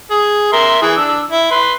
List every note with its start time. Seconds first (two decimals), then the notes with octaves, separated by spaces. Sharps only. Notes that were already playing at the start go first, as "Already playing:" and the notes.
0.11 G#4
0.53 A#4 E5 C6
0.82 E3 G#4
0.97 D4 E6
1.31 E4
1.51 B4 C6